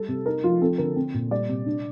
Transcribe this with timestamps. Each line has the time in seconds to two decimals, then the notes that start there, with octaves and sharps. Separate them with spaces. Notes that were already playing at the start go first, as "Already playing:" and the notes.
Already playing: G3 A4
0.09 C3
0.26 D#4 A#4
0.44 F3 F4
0.61 C4 A4
0.78 D3 A#4
0.96 C4
1.14 A#2
1.31 G3 D5
1.49 C3
1.66 D4